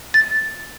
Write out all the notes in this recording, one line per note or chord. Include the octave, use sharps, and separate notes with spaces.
A6